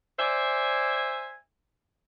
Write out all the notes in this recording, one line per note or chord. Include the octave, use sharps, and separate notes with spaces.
C5 D5 E5 G#5